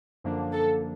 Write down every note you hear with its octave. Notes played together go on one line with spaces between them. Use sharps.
F#2 D3 F3 A#3 D4
A4